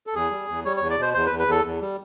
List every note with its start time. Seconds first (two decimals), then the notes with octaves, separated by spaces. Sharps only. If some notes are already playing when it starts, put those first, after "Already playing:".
0.07 A4
0.14 E2 G#4
0.31 G3
0.48 E2
0.65 G3 C#5
0.77 E2 C#5
0.90 D5
0.98 B2 C5
1.14 E2 C5
1.26 B4
1.31 E2
1.39 B4
1.48 E2 A4
1.64 E2
1.81 G3